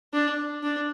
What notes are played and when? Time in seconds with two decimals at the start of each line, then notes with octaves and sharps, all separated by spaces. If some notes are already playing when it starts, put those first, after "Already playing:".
0.13 D4
0.63 D4